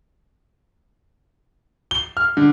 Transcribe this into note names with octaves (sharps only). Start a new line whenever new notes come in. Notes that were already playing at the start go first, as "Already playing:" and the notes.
G7
F6
D3